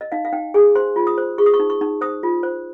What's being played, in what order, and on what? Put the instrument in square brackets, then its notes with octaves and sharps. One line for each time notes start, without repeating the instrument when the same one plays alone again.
[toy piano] D#5
D#4 F5
F5
D#4 G5
G#4 G#5
C5 C6
F4
D#6
C5
G#4 C#6
D#6
C#6
D#4
C#6
D#4
C5 D#6
F4
C5